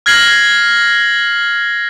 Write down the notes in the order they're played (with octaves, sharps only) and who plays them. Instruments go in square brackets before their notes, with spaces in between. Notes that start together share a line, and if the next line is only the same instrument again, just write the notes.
[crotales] F6 G#6 A#6 C7 F#7